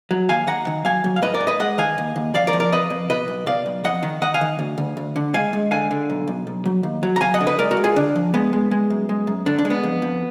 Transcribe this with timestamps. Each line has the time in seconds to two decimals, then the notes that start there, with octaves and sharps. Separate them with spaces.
0.11 F#3
0.29 D#2 F5 G#5
0.47 D#2 F#5 A#5
0.67 D#3
0.85 F#3 F5 G#5
1.04 F#3
1.16 F5
1.22 G#2 B4 D#5
1.34 A#4 D5
1.41 G#2
1.47 B4 D#5
1.60 G#3 D#5 F#5
1.78 D#3 F5 G#5
1.98 D#2
2.16 D#2
2.34 F2 D5 F5
2.47 A#4 D5
2.53 F3
2.60 A#4 D5
2.72 F2 B4 D#5
2.90 F2
3.10 B2 B4 D#5
3.28 B1
3.46 B2 D5 F5
3.66 B1
3.84 F2 D#5 F#5
4.03 D#3
4.22 D#3 D#5 F#5
4.34 F5 G#5
4.41 D#3
4.59 D2
4.78 D2
4.97 D2
5.16 D3
5.34 G#3 F5 G#5
5.53 G#3
5.71 D3 F5 G#5
5.91 D3
6.10 B1
6.28 B1
6.47 B1
6.66 F#3
6.83 D#2
7.03 F#3
7.16 A#5
7.21 F#3 F5 G#5
7.34 D#5 F#5
7.41 D3
7.47 B4 D#5
7.59 G#3 A#4 D5
7.71 F#4 A#4
7.77 G#3
7.84 F4 G#4
7.96 D3 D4
8.15 F3
8.34 G#3 B3
8.53 G#3
8.71 G#3
8.90 F#2
9.09 G#3
9.27 F#2
9.46 D3 D4
9.58 D4
9.65 G#3
9.70 B3
9.83 F2
10.02 F2